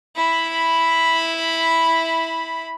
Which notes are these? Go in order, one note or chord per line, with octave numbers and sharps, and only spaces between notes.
E4 B5